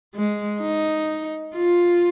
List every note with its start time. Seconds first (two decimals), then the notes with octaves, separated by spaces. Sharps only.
0.15 G#3
0.61 D#4
1.56 F4